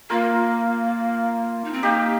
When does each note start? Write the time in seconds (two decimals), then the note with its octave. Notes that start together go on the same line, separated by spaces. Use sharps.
0.10 A#3 F4 A#4
1.64 D#4
1.73 C4
1.83 A#3 D#4 G4